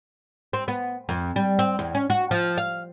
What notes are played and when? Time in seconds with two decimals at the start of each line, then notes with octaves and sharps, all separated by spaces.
0.53 C4
0.68 B3
1.09 F2
1.36 G3
1.59 C4
1.79 E2
1.95 C#4
2.10 F#4
2.31 F3
2.58 F5